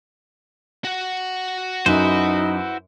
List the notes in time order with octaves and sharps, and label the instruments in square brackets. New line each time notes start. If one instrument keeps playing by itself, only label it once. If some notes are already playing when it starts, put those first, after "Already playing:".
[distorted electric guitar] F#4 F#5
[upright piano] F#2 [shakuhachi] D#4 [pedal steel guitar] E4 B4 C5